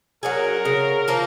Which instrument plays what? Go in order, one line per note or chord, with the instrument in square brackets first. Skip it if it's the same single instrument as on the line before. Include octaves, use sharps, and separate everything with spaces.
[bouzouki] F#3 C#4 G#4 [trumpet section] A#4
[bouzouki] C#3
F3 A#3 F4